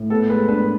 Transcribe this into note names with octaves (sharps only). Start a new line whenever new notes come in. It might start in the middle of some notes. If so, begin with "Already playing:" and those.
Already playing: A2
B3 A4
G#3 B4
D4 B4